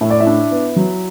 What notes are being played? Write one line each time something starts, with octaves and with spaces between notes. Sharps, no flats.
A2 E5
D5
E4 E5
D4
B3
F#3